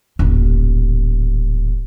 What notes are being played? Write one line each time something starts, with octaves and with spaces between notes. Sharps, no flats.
D#1 A1